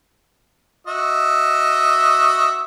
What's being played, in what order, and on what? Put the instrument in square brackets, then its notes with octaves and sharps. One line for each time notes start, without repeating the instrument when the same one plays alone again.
[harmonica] F#4 D#5 E5